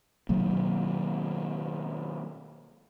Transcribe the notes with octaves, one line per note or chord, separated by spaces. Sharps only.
B2 D#3 F#3 A#3